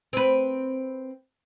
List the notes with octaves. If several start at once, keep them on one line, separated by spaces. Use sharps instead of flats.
C4 B4